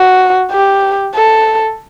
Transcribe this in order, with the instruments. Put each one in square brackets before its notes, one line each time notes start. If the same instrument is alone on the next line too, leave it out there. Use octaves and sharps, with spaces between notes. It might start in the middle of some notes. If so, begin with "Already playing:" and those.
Already playing: [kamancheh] F#4
G4
A4